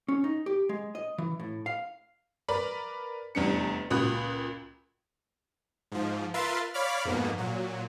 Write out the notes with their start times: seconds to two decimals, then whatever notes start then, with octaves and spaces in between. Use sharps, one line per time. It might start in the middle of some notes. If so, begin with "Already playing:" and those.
0.08 C#4
0.24 D#4
0.46 G4
0.69 G#3
0.95 D#5
1.18 E3
1.40 A2
1.66 F5
2.48 A#4 B4 D5 B5
3.35 F1 E2 G3 D4 C#7
3.90 C#2 A#2 F#4 B5 D#6 F#6
5.92 G#2 F3
6.34 F4 A#4 B4 E5 C6 A6
6.74 C#5 D5 F5 B5 D6 F6
7.05 F2 G#2 B2 A#3 B3
7.38 A#2 F#3